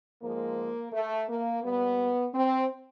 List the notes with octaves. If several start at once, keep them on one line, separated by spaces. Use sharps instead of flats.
G#2 F3 G#3 A#3
A3
A#3
A#2 G3 B3
C4